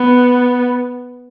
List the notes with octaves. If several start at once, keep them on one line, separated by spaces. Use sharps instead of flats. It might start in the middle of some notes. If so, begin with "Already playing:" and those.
Already playing: B3